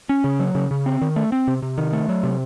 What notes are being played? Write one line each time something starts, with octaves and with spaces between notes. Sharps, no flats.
C#4
C#3
F#3
C#3
C#3
C4
D#3
A3
C4
C3
C3
D#3
A3
F#3
C3